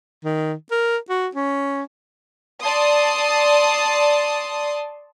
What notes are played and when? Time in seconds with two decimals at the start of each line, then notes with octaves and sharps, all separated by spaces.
0.24 D#3
0.71 A#4
1.10 F#4
1.35 C#4
2.63 D5 A5 C6 D#6